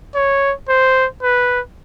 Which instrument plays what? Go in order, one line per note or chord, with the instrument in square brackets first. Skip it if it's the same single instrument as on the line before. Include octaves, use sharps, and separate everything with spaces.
[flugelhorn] C#5
C5
B4